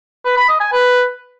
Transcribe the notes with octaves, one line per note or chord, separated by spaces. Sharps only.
B4
B5
D#5
G#5
B4